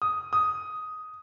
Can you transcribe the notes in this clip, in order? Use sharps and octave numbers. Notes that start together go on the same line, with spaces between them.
D#6
D#6